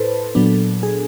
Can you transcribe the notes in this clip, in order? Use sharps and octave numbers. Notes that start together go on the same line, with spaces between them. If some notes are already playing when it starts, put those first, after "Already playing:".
Already playing: A2 E4 A4 B4 C5
A#2 F#3 B3 D4
G#4